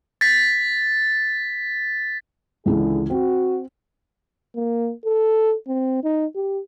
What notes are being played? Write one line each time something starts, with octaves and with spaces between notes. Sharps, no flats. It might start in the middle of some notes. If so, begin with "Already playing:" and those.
A6 B6
C#2 D3 E3 G#3 E4 G#4
C4 F#4
A#3
A4
C4
D#4
G4